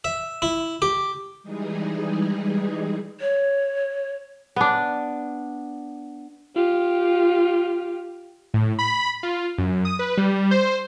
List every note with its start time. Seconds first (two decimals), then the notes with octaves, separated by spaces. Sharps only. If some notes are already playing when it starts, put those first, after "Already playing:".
0.04 E5
0.42 E4
0.82 G4
1.43 E3 G3 G#3 D#4 G#4
3.20 C#5
4.56 B3 D4
6.55 F4 G4
8.54 A2
8.79 B5
9.23 F4
9.58 F#2
9.85 D#6
9.99 B4
10.17 G3
10.51 C5